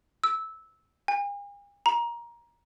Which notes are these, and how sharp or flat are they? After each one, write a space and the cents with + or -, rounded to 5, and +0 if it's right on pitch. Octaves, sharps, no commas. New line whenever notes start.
E6 -15
G#5 -45
A#5 +20